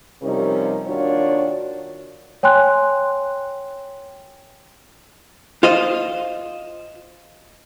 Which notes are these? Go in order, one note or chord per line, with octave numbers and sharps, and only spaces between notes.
C3 F3 G3 C#4 D#4 A#4
D#2 D#3 D4 F4 F#4 C#5
C#5 G5 G#5 C6 F#6
F4 C5 D#5